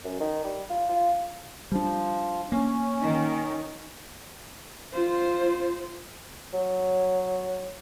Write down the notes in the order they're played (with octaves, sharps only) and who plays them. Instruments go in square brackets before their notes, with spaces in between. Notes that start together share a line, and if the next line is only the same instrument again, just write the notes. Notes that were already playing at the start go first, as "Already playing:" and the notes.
[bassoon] F#2
D#3
G3
F4
F4
[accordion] F3 [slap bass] G3 D4
[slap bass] A#3 [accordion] C#4
[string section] D#3
[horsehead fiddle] F4 C5
[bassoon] F#3